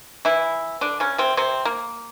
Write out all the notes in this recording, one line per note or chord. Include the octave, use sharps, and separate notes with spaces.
E3 E4
D3 D4
C#3 C#4
C3 C4
C3 C4
A#3